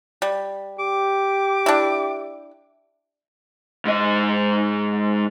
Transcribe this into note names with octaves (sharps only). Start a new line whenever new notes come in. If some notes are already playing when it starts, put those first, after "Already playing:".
G3
G4 D6
D4 E4
G#2 D#5